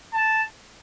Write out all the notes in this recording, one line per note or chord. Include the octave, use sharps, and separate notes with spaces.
A5